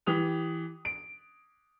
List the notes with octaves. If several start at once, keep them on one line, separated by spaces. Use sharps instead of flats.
E3 G4 D#6 F7
D7